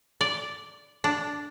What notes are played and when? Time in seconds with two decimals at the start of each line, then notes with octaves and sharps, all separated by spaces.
0.21 D5
1.04 D4